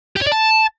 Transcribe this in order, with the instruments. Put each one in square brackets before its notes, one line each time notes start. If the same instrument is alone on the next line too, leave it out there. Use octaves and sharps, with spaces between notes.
[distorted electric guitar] G4
C#5
D5
A5